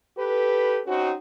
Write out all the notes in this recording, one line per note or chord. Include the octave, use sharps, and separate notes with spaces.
G4 A4 B4
C4 C#4 D#4 F#4